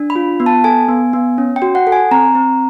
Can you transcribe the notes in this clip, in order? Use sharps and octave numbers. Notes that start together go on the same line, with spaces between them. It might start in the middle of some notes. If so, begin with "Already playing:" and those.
Already playing: D4
B5
F4
B3
A5
A4 G#5
B3
B3
C#4
G5
F#4
F#5
A4
G#5
C4 A#5
C4